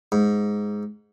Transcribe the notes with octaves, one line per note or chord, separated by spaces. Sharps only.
G#2